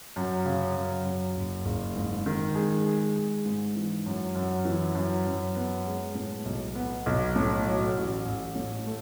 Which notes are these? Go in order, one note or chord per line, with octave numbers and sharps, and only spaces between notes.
F#2
C#3
F#2
F#2
F#1
F#1
G#2
D#3
G#3
G#3
G#3
G#2
E3
F#2
F#2
E3
F#2
F#2
B3
G#3
A2
B1
B3
B1
A2
F#3
A1
A1
A2
A3